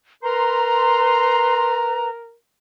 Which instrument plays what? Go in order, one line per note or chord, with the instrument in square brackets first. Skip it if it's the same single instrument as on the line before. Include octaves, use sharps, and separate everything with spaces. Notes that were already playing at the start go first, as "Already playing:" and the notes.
[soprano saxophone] A#4 [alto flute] B4 [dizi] A#5 [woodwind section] C6